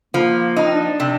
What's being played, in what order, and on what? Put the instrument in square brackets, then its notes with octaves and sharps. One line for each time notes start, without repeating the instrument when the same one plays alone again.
[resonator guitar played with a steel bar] F3 [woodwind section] A#3
[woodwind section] D4 [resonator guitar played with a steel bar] D#4
[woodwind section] C4
D4
[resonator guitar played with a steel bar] C3